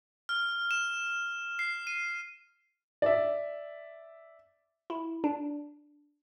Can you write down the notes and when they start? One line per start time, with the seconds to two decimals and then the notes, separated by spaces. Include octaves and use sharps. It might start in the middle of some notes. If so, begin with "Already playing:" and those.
0.29 F6
0.71 E7
1.59 C7
1.87 D#7
3.02 D5 E5
4.90 E4
5.24 D4